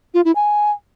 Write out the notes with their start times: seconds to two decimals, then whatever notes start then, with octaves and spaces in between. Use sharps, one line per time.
0.14 F4
0.25 E4
0.35 G#5